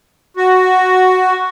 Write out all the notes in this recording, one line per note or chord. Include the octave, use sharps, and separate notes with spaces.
F#4